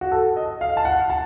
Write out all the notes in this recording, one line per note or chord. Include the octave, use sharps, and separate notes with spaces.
F#4
A4
D#5
F5
A5
F#5
A5